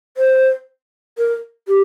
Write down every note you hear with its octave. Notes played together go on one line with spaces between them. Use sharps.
C5
A#4
G4